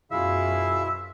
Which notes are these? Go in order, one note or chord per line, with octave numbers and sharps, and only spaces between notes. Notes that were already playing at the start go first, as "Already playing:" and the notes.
F#2 B2 E4 F4 G#4 E5 F5